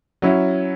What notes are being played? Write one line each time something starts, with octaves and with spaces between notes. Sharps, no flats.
F#3 C#4 E4